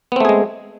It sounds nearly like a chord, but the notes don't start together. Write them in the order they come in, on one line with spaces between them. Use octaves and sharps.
B3 C4 A3 G#4 G#3